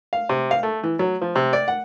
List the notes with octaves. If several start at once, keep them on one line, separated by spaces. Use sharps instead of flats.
F5
C3
F5
A3
E3
F#3
F3
C3
D5
F#5